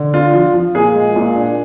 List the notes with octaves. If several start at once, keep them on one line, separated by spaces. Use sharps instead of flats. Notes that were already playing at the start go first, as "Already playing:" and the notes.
Already playing: D3
D4 F4
F3 F4
F3
A#2 G#4
G#3
A#2
D4